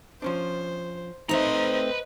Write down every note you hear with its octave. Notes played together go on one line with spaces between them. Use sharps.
F3 C#4 D4 C5
A3 C4 D#4 B4 C5 D#5 E5 A#5